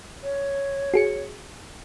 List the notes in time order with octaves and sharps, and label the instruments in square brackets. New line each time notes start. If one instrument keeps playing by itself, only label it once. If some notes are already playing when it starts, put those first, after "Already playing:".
[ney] C#5
[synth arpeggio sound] F#4 G#4 C#7